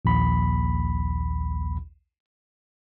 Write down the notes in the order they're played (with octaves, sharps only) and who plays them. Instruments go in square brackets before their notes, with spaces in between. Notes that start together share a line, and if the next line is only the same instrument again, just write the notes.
[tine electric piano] A#1 D#2 B5